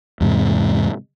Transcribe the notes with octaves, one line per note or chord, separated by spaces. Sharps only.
E2 G#2 C3